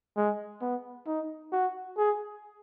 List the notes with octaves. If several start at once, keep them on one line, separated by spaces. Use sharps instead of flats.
G#3
B3
D#4
F#4
G#4